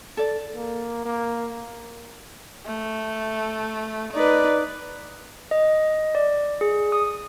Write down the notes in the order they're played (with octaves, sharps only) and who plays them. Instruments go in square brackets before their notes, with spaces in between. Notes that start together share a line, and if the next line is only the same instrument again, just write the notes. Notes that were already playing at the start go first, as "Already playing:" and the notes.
[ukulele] A4 D5
[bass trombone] A#3
A#3
[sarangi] A3
[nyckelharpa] D#4 B4 [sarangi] D5
[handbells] D#5
D5
G#4
D#6